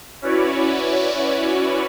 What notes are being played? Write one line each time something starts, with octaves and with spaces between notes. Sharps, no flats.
C#4 E4 F#4 B4 C#5 D5